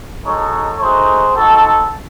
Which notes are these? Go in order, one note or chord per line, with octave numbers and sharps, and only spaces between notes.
G#3 D#4 F#4 A4 C#5
A3 D#4 F#4 G#4 C5
C4 D#4 F#4 A4